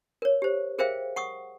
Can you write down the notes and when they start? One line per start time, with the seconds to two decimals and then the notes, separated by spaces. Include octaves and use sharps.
0.22 A#4 C#5
0.42 G4 C5
0.79 G#4 A#4 C5 E5 F5 G5
1.16 F#5 C#6 D#6